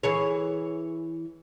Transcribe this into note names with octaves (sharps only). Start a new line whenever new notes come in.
E3 G#4 C#5